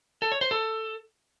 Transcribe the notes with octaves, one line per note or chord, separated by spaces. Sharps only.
A4
C#5
C5
A4